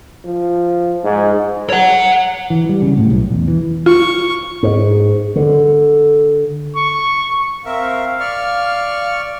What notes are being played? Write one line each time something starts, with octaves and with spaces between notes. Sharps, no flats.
F3
G#2
C#5 F#5
E3
G3
C#3
A2
B1
E2
E3
F4 C#6
G#2
D3
C#6
C4 A#4 E5 F5
D5 C#6 F6